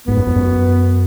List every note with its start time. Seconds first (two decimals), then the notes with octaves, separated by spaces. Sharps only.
0.07 G#2 B3
0.17 F#2
0.27 F2
0.36 F#2